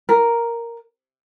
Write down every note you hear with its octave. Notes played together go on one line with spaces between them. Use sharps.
A#4